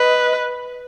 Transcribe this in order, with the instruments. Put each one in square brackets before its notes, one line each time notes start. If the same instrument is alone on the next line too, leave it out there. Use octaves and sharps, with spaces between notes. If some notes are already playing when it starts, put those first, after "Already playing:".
Already playing: [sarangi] B4 [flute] D#5